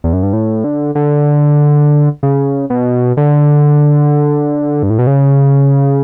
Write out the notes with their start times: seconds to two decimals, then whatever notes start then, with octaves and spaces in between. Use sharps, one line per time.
0.04 E2
0.13 F#2
0.23 G2
0.33 A2
0.64 D3
0.95 D3
2.23 C#3
2.70 B2
3.17 D3
4.83 G2
4.90 A2
4.99 B2
5.07 C#3